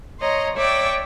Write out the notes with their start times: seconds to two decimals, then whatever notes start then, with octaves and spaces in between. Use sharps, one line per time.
0.20 C#5 D#5 A#5 C6
0.56 C#5 D5 E5 G5